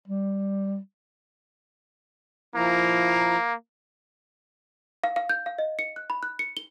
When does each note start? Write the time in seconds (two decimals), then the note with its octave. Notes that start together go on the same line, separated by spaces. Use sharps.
0.08 G3
2.55 F3 A#3 E4 A#5
5.04 F5
5.16 F5
5.29 G6
5.46 F5
5.58 D#5
5.79 C#7
5.96 F#6
6.10 B5
6.23 F#6
6.39 C#7
6.57 G7